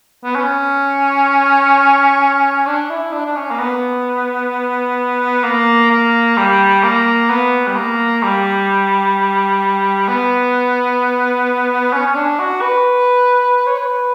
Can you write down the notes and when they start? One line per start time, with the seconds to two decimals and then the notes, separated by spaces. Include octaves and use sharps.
0.24 B3
0.36 C#4
2.67 D4
2.90 E4
3.12 D4
3.26 D4
3.36 C#4
3.51 A#3
3.60 B3
5.44 A#3
5.91 A#3
6.37 G3
6.83 A#3
7.30 B3
7.67 G3
7.76 A#3
8.23 G3
10.08 B3
11.93 C#4
12.06 C#4
12.15 D4
12.39 F#4
12.62 B4
13.67 C#5
13.78 B4